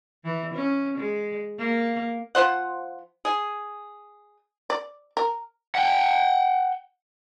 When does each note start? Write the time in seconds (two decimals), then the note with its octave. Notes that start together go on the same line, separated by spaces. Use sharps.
0.24 E3
0.55 C#4
0.98 G#3
1.59 A#3
2.35 F3 F4 C5 F#5
3.25 G#4
4.70 D5
5.17 A#4
5.75 F#5 G5